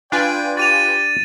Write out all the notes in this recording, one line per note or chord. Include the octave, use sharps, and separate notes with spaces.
D4 F4 B4 D5 G5 G#5
G4 A6 D#7 F7